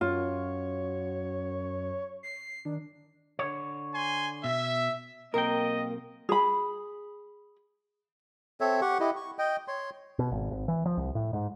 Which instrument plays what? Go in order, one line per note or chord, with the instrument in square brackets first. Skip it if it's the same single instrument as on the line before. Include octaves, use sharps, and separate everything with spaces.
[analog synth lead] F#2 [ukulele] F4 [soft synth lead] C#5
[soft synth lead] C7
[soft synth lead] D#3 [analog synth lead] D4
[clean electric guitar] D3 C#5
[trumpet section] G#5 C6
[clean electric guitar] B2 [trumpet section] E5
[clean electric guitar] B1 C4 G5 [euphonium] A#3 [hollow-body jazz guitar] A#4 [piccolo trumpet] D#5
[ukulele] G#4 B5
[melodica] C4 A4 C#5 E5
G4 F#5 C#6
E4 G4 D#5
C#6
D#5 G5
C#5 C6
[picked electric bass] B2
G#1
G#1
E3
F3
C2
A2
G#2